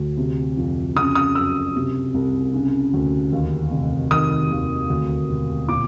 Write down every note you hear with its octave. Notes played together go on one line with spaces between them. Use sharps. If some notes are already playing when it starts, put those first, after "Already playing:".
Already playing: D2
C3
F2
C#3 D#6
D#6
F#2 E6
C3
C2
C#3
D2
D#2
F1
D#3 D#6
D#2
D2
E1
A#2 D6